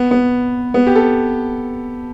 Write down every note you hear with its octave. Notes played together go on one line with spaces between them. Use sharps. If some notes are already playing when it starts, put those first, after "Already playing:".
Already playing: B3
B3
B3
G4
A4